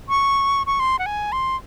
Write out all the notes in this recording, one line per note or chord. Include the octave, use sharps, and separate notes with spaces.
C#6
C#6
C6
F#5
G#5
C6